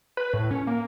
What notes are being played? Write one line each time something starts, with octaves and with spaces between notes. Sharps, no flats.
B4
A2
C#4
A#3